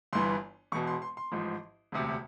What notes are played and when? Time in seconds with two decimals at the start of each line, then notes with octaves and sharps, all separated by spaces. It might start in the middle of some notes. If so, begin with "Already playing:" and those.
0.13 G1 G2 E3 C6
0.72 E1 E2 B2 C#6
0.87 C6
1.02 C6
1.17 C6
1.32 A1 G#2 F3
1.92 E1 D2 C3